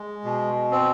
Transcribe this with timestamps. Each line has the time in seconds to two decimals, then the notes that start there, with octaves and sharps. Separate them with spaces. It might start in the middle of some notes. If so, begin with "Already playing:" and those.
Already playing: G#3
0.25 B2
0.71 C4